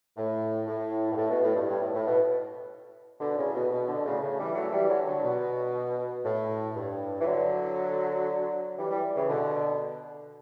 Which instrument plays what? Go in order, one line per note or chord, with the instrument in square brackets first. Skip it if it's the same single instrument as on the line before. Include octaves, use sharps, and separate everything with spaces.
[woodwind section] A2
A2
G2
A2
B2
A2
G2
G2
A2
A2
B2
B2 D3
A2 C#3
B2
B2
B2 D3
A2 C#3
A2 C#3
E3 G3
F#3 A3
E3 G3
D3 F#3
D3 F#3
B2
A2
G2
E3
D3 F#3
E3 G3
E3 G3
C#3 E3
B2 D3